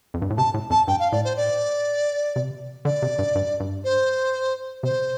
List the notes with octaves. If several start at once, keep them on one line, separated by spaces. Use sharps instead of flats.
F2
G2
A2
C3 A5
A2
F2 A5
G2 G5
F5
A2 D5
C5
D5
C3
D3 D5
C3
G2
G2
G2
C5
C3 C5